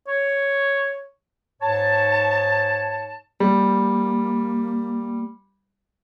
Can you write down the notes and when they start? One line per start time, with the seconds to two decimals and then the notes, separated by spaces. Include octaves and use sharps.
0.08 C#5
1.62 G#2 C#5 A5
3.40 G3 A#3